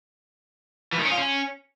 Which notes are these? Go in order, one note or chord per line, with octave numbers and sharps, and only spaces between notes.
E3
D#3
C#4
F4
C#4